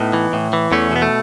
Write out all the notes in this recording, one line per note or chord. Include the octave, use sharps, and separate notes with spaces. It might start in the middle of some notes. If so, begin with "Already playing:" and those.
Already playing: A2 B3 D#4
E3
A2
E3
E2 A3 C#4
B2 B3
A3